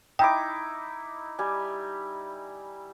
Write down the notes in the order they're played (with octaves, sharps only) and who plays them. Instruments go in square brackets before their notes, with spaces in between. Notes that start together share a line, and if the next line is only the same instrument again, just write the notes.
[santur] D#4 E4 D6 [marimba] G5
[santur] G3 G#5